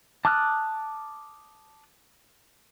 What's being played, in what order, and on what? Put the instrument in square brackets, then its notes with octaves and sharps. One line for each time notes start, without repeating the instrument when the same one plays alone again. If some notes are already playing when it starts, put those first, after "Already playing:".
[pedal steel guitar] A5 D6 D#6 F6 F#6